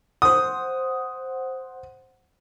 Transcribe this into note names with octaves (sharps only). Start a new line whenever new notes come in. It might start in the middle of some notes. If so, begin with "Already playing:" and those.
C5 F#5 D#6